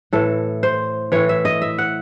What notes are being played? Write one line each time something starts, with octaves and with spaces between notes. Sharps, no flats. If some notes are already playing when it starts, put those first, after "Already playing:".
A2 E3 A4
C5
A2 E3 C#5
E5
D#5
E5
F#5